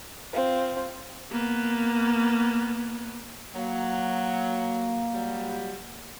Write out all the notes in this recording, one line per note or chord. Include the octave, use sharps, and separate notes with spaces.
C4 F4
A#3 B3
F#3 A#3
F#3 G3